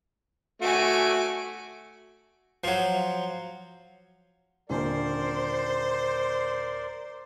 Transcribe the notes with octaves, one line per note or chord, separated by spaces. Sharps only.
A3 F#4 G#5 D7
F3 F#3
D#1 D3 A#4 C5 D5